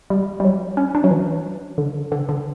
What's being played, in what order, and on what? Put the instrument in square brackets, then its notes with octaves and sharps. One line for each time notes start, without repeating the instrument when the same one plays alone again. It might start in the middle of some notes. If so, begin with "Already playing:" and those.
[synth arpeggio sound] G3
G3
F#3
C#4
D4
F#3
E3
D3
D3
D3